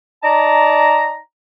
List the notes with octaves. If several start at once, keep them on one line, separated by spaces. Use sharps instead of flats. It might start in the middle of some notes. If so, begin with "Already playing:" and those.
D#4 D5 A5 A#5